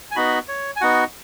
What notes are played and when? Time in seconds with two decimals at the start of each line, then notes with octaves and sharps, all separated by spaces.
0.11 G#5
0.16 B3 D#4 F#4 B5
0.48 C#5
0.76 G#5
0.81 B3 D#4 F#4 F#5